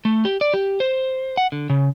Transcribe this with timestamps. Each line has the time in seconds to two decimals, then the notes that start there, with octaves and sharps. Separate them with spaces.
0.05 A3
0.25 G4
0.41 D5
0.54 G4
0.80 C5
1.37 F#5
1.52 D3
1.70 C#3